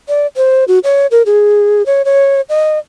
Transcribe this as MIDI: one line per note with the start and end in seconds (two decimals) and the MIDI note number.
0.09 0.26 74
0.37 0.64 72
0.68 0.79 66
0.84 1.07 73
1.11 1.22 70
1.26 1.85 68
1.86 2.02 73
2.05 2.41 73
2.49 2.79 75